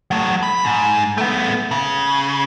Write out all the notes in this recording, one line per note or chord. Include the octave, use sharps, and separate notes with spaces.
F#3 A3
B5
G#2
A3 B3
C#3